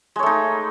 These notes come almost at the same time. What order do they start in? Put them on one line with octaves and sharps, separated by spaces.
G#3 C#5 A3 D#4